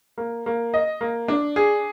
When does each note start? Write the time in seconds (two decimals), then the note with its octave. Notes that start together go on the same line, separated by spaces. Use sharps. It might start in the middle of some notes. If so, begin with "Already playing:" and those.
0.18 A#3
0.46 A#3
0.74 D#5
1.01 A#3
1.28 D4
1.56 G#4